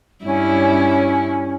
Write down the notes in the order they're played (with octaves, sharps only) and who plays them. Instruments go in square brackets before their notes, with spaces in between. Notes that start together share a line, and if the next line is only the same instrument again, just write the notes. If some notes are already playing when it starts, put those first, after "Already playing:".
[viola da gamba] G2 E4 [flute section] C#4